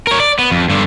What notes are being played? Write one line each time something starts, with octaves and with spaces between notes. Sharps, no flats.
A#4 C#5
D5
B3
F2
G2 D3